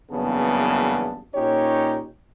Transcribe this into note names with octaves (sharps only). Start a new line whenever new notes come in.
F#1 E2 G2 C#3 B3 A5
A#2 C#4 D#4 G4 C#5